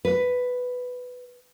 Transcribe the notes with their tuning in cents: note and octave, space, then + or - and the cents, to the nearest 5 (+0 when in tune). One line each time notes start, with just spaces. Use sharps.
B4 +5